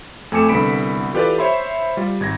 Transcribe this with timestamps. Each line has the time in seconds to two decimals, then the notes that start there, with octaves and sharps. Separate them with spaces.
0.32 F2 A3 G#5 D6 C#7 E7
0.49 C2 D3 B3 B5 B6 D7
1.13 E3 F4 G4 A4 B4 D5
1.38 C5 C#5 E5 B5 C6
1.97 G3 F4
2.20 G#1 G#6 A#6